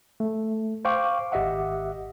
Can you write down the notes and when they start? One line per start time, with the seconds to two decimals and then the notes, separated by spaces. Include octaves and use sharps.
0.20 A3
0.85 C5 F5 G5 C#6 D6
1.32 G#1 G4 D#5 E5 F#5